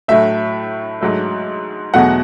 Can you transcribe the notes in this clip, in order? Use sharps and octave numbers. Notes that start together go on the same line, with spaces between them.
A2 F#3 A3 E5
G#2 F#3 A3
E2 B2 F#3 A3 F#5